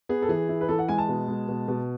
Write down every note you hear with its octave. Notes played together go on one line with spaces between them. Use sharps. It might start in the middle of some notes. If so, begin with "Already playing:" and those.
B3 G#4
A4
E3 G#4
E4
B4
E3 A4
F#5
G#3 G#5
A5
B2
G#3
B2
B2